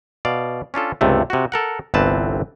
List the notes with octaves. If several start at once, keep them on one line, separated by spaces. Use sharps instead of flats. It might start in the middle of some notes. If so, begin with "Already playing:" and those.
B2 D5 F5
C#4 D4 F4 A4
C#2 G2 C3 A3
C3 F#4
A4 A#4 F#5
G1 C2 E3 C4 B4 A5